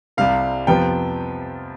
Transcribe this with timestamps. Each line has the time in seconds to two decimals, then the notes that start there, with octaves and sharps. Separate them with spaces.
0.17 C2 C3 G3 F5
0.67 F2 C3 F3 B3 G5